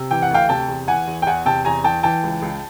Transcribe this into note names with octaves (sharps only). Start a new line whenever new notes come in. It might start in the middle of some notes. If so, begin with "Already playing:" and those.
Already playing: C3
E3 G5
F#5
D2 F5 G5
C3 G5 A5
E2
E3 F#5 G#5
E2
G5
E2 F#5 G#5
C3 G5 A5
E2 G#5 A#5
E3 G5 A5
E3 G5 A5
C#2
C#2